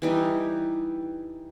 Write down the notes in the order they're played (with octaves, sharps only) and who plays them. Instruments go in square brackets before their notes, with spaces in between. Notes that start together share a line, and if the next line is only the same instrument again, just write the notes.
[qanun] E3 G3 D#4